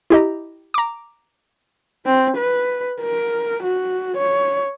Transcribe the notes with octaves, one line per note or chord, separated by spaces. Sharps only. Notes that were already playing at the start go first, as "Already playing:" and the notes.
E4 G4 D#5 A#5
A#5 D6
C4
B4
A#4
F#4
C#5